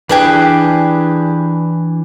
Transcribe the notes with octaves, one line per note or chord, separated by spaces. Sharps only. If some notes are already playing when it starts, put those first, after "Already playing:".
E3 D4 G4 G#4 B4